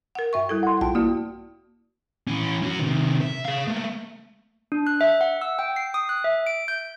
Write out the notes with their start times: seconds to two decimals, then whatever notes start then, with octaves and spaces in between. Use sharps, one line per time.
0.15 A#4 F#5
0.33 G2 E5 C#6
0.49 G3 E4 A4
0.63 F#5 C6
0.81 A#1 F4 G5 A5
0.95 A#3 E4 F#4 D5
2.27 E3 C#4
2.63 C#4 F#4
2.79 C3 D#3
3.21 E5
3.46 G#4 F5
3.68 A3 A#3
4.72 D4
4.87 F#6
5.01 E5
5.21 F#5
5.41 E6
5.59 G5
5.76 C7
5.94 D#6
6.09 F#6
6.24 E5
6.47 D7
6.68 G6